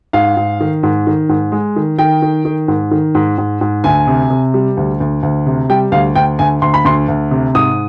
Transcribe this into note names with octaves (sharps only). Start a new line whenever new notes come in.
G#2 F5
G#2
D#3
G#2
D#3
G#2
G#3
D#3
D#3 G5
D#3
D#3
G#2
D#3
G#2
G#2
G#2
D2 G#5
C3
C3
G3
D2
D2
D2
C3
G3 G5
D2 F5
D2 G5
D2 G#5
D2 C6
B5
D2 C6
D2
C3
G#2 D#6